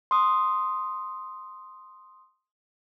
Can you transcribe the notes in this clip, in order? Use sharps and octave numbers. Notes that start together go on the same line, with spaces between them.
C6 D#6